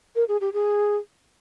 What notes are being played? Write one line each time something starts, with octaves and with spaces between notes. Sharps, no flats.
A#4
G#4
G4
G#4